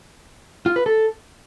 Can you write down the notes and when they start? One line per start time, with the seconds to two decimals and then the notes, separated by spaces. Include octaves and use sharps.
0.66 F4
0.76 B4
0.86 A4